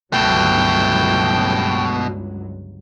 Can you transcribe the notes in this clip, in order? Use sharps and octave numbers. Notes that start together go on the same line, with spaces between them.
G1 C#2 B2 F#3 A3 G5